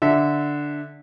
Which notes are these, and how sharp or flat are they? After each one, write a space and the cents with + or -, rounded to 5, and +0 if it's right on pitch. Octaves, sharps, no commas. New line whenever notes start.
D3 +0 E5 -15